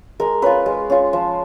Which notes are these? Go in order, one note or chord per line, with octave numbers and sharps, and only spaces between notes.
G#3 A#4
C#4 F4 B4
G#3
C#4 F4
F3